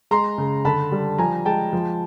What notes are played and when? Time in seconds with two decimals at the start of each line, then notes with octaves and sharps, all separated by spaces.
0.11 G#3 A#5 C6
0.38 C#3
0.65 D3 A5 B5
0.92 G3
1.18 F3 G#5 A#5
1.45 G#3 G5 A5
1.73 F3